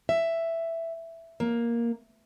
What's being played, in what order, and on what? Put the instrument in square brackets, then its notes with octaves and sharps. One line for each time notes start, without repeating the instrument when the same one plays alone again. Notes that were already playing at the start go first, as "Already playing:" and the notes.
[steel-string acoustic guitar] E5
A#3